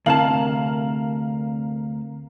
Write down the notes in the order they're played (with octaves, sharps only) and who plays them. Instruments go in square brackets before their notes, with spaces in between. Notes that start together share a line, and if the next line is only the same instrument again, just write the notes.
[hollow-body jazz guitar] D2 C3 A5 [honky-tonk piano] A#4 F5 F#7